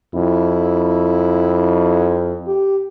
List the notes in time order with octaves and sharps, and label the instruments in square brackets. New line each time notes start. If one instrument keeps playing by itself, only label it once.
[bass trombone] F2 [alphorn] E4
[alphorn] G4